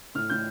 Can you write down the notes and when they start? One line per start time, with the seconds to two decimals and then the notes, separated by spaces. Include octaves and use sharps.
0.15 A2 F6
0.30 A2 G6